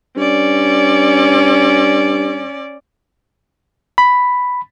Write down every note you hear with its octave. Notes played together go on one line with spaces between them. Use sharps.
G2 C#4 D5
B5